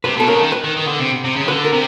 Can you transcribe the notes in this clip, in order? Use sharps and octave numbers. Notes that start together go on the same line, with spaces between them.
C3 B4
B2 A4
C#3 A#4
D3
D#3
B4
D#3
D#3
D3
C3
C3
C#3
D#3
D3 B4
A#4
C3